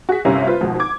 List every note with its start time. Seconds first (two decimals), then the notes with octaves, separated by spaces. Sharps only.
0.09 F#4 G#4 B6
0.25 G1 C3 C#4 E4 A#4 F5
0.47 F4 B4 C5
0.61 G#1 G#2 B2 F3
0.80 D6 G#6